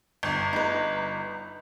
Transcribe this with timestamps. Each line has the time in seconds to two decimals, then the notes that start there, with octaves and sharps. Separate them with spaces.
0.23 G1
0.53 D#4 B4